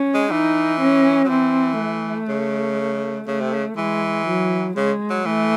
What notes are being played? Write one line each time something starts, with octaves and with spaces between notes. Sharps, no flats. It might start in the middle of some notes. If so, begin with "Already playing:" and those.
Already playing: C#4
G#3
E3 D#4
C#4
F#3
E3 C4
A3
C#3
C#3 A3
C3
C#3
E3 G#3
F#3
C#3 G#3
F#3
E3 A3